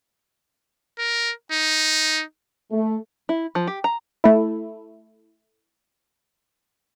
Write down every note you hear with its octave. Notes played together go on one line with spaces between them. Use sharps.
A#4
D#4
A3
E4
F3
G4
A#5
A3 E4